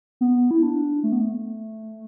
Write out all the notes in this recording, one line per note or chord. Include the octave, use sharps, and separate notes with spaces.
B3
E4
D4
A3
B3
A3